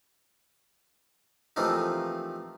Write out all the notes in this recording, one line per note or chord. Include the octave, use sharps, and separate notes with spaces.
C3 E3 F3 A3 A#3 D#4